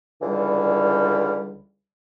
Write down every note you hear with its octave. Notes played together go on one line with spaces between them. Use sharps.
C#2 D3 E3 G3